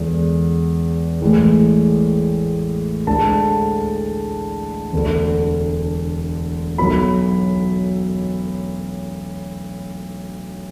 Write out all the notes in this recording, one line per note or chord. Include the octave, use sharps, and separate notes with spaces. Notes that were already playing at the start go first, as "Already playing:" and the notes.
Already playing: E2 D3 G#3
A1 A2 G#3
D2 D3 G#3 A5
E1 D2 D3
B1 B2 F#3 B5